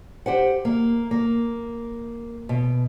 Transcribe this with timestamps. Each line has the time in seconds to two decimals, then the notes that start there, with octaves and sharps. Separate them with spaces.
0.26 G4 C5 F#5
0.65 A#3
1.11 A#3
2.49 B2